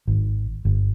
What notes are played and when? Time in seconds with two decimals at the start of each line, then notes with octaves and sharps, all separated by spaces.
0.08 G#1
0.65 G1